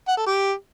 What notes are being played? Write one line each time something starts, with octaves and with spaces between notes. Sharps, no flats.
F#5
A4
G4